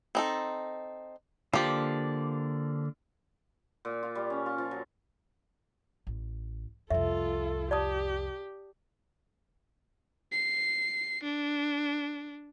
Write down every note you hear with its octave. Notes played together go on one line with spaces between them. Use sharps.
C4 D#4 A4
D3 F3 A#3 G4 D5
A#2
F4
G3
C#4
F4
F3
F#3
A1
C2 F2 F4 A4 E5
G4 D5 A5 D#6
C7
D4